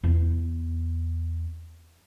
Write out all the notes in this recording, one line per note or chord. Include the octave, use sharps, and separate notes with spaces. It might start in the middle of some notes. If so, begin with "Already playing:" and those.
E2 B3